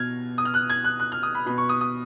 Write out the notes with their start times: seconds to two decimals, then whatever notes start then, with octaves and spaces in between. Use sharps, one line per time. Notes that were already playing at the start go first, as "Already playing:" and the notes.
Already playing: B2 F6 G#6
0.38 D#6
0.45 F6
0.54 F#6
0.70 G#6
0.84 F#6
1.00 F#6
1.12 F6
1.23 D#6
1.35 B5
1.46 B2 B5
1.58 C#6
1.69 D#6
1.81 D#6